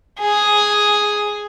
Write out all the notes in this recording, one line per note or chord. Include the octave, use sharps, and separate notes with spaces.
G#4